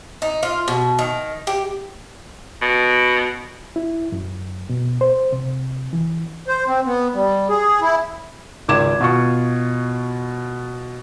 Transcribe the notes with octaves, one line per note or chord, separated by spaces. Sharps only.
D#4
F4
B2
D#3
G4
B2
E4
F#2
B2
C5
C3
E3
C5
C4
B3
G3
G#4
E4
G#1 C#2 D6 G#6 E7
B2 F4 C#6